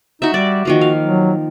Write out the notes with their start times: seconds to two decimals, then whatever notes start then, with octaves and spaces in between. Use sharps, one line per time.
0.22 D#4 F#4 E5
0.34 G3 D5
0.65 D#3 F3 A#3 F#4
0.81 F5
1.03 F#3